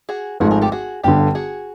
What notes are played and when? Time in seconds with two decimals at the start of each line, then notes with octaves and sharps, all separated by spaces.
0.09 F#4 G#4
0.40 G#1 G#2 F3 A3 F#4 G#4
0.51 G#4 A#4
0.61 G4 A4
0.72 F#4 G#4
1.03 G1 G2 D3 F4 G4
1.35 F#4 G#4